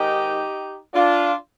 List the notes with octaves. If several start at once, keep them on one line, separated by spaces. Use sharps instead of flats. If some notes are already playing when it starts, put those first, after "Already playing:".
Already playing: G#2 D#3 D#4 G4
D4 F4